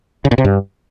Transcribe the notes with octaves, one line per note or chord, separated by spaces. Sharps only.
C#3
A#2
C3
G2